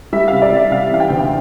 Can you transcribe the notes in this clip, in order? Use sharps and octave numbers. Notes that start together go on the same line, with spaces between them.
G3 E5
C3 F5
D5
G3 E5
C3 F5
E3 F5
G5
D2